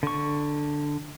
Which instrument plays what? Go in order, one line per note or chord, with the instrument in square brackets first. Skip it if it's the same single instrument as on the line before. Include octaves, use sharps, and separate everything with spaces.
[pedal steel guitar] D3 C#6